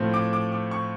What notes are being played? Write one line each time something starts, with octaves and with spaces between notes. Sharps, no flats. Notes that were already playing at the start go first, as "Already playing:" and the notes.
Already playing: A2 F3 A3 C4
D6
D6
D6
C#6